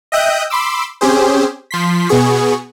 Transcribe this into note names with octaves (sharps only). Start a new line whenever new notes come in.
D#5 E5 G5 D#6 F#6 G6
B5 C6 D6 E6
C4 C#4 G4 G#4 C5
F3 C6 B6
B2 B3 G#4 C#6